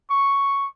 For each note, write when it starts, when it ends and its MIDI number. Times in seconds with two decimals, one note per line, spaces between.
0.10 0.66 85